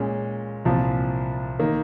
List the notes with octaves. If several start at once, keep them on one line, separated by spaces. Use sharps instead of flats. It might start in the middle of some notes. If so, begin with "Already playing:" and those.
Already playing: A#2 G#3 C#4
C2 A#2 F3
D#3 A#3